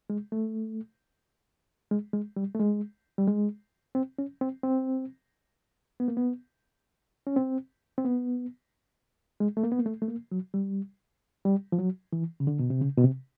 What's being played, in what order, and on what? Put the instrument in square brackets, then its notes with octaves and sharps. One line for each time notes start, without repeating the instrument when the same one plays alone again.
[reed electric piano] G#3
A3
G#3
G#3
G3
A3
G#3
G3
G#3
C4
C#4
C4
C4
B3
A#3
B3
C#4
C4
C4
B3
G#3
A3
A#3
B3
A#3
A3
A3
A#3
F#3
G3
G3
F3
F#3
E3
C#3
D3
B2
C3
C#3
B2
C3